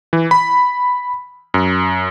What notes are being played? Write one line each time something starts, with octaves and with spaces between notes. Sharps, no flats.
E3
B5
F#2